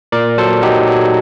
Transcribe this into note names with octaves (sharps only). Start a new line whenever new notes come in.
A#2 A#4 D5
F#3 A4 C5
F#3 D#4 G4
F#3